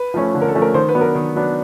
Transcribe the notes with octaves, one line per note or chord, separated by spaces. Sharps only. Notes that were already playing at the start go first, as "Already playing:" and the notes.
Already playing: B4
F3 A3 C#4
D3
A#4
A4
F3 A3 C#4
A#4
D#3 C5
B4
F#3 B3 D4
A#4
D#3
F#3 B3 D4